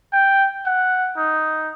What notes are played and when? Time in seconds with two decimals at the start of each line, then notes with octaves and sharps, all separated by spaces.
0.13 G5
0.66 F#5
1.17 D#4